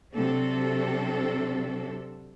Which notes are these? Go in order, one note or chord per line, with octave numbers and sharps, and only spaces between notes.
C3 F#3 C4 D4 A4